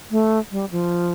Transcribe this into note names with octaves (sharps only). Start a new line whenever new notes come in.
A3
G3
F3